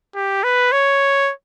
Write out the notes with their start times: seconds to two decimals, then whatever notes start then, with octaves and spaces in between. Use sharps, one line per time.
0.15 G4
0.44 B4
0.72 C#5